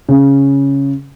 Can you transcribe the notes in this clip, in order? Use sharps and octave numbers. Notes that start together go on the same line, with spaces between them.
C#3